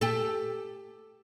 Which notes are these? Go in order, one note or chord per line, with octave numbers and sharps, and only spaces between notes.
G4 A4